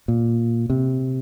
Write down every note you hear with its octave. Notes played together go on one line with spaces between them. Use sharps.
A#2
C3